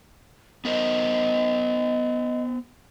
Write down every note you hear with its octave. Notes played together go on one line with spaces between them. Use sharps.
B3 A#4 C5 D#5